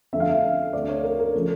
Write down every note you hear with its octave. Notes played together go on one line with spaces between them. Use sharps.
F2 D3 F3 A3 E5
F5
E5
D2 D3 A3 D5
C#5
A#4
A#4
C#3 F3 A3